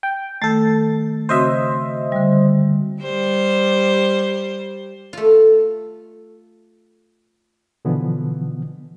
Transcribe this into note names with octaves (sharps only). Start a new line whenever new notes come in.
G5
D#3 A3 A4 A6
C#3 C4 F#4 C5 D#5 E5
D3 G3
G3 C5
A3 F4
B2 D3 E3 F3 B3